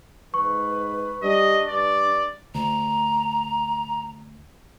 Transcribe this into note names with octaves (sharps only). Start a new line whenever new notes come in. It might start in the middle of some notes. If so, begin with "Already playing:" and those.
G#2 B4 C#6
G3 D4 D#5
G2 D5
D2 A#5